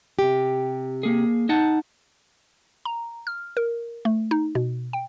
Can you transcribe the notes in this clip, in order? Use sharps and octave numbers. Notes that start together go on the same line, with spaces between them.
C3 G4
A#3 G#4
D#4 F#5 A5
A#5
F6
A#4
A3
D#4
B2
G5